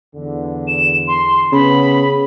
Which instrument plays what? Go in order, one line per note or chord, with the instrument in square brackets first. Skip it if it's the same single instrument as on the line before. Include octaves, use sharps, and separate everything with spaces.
[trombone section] E2 D3
[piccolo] E7
C6
[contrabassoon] C#3 [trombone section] B3 [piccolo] B5